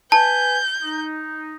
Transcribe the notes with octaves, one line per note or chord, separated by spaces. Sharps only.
B4 G#5 A5 G6
D#4